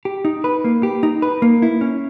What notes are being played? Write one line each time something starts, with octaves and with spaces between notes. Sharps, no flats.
G4
D#4
B4
A#3
G4
D#4
B4
A#3
E4
C#4